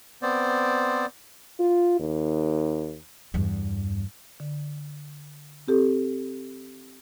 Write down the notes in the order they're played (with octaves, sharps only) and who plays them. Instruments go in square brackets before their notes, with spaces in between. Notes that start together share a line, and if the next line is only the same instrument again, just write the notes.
[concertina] B3 C4 C5 D5
[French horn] F4
D#2
[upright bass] E2 G2
[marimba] D3
C4 G4 A4